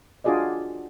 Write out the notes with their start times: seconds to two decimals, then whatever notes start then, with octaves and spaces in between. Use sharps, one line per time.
0.24 D4 F4 F#4 G#4 D5 D#5